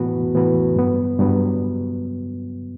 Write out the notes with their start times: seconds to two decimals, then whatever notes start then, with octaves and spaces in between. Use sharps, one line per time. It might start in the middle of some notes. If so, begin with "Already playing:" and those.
Already playing: A2 E3 B3 F#4 B4
0.34 A2 E3 B3 F#4 B4
0.76 G2 F#3 B3
1.19 G2 F#3 B3